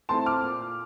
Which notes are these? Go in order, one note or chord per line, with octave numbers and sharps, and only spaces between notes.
A3 C4 E4 A5 C6
D6 F6
A#2